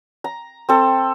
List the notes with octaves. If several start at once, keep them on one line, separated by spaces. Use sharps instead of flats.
A#5
C4 A4